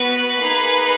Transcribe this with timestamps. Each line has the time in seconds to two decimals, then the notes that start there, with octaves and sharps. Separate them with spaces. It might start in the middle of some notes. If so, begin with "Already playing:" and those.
Already playing: B3 F#4 B4
0.38 A#3 D#4 G#4